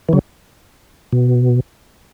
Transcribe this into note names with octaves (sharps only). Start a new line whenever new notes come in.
E3
C#3 F#3
B2